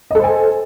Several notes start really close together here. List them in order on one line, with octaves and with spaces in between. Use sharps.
D#5 A4 C5 G#5